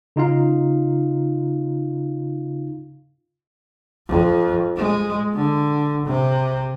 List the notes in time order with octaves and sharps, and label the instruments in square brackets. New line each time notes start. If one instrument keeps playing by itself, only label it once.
[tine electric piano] C#3 D#4 F4 F5
[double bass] F2
G#3
D3
C3